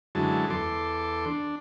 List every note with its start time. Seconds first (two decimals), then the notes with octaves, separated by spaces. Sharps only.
0.15 F#2 D3 E3 F#3 G#3 A5
0.50 E2 A4 C6 D6
1.26 D4